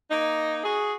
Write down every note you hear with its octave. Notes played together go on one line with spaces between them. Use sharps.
A#3 D#4
F#4 G#4